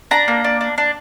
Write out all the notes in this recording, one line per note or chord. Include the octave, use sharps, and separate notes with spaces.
D4 A#5
A#3
D4
D4
D4